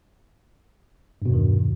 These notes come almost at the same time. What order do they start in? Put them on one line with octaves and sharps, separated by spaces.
G2 B2 E2 D#3